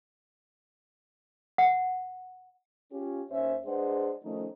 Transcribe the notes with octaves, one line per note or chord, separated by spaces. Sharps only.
F#5
C#4 F4 G4
D#2 C#4 C5 E5
G#3 D4 G#4 B4 C5 F#5
D#3 F3 A3 C#4 D#4